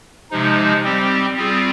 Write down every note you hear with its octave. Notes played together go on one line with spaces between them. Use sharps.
C3 F3 G#3 D#4
G3 C4 G4
G3 C4 F4 G#4